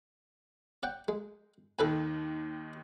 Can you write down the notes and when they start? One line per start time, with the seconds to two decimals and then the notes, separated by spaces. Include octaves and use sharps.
0.83 D5 F#5 G5
1.08 G#3
1.79 D#2 D#3 A4 B4 G#5